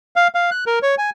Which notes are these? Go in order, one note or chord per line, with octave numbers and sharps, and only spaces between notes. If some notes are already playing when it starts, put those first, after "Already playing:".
F5
F5
F#6
A#4
C#5
G#5